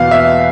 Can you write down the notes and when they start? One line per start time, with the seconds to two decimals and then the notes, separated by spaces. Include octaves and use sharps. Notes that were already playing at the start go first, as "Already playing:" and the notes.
Already playing: E2 B2 B3 F5
0.11 E5